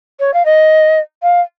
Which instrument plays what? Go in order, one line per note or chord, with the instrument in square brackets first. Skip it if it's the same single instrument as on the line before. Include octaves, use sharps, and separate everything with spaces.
[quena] C#5
F5
D#5
F5